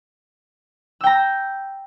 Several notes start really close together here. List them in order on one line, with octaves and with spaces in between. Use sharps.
E6 G5 A#5